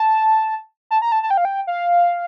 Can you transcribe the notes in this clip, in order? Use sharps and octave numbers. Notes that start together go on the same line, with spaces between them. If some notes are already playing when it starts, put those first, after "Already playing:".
Already playing: A5
A5
A#5
A5
A5
G5
F5
G5
F5